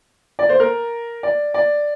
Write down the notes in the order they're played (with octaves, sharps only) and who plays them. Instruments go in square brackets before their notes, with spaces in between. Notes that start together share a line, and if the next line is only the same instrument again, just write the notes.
[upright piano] D5
C5
A#4
D5
D5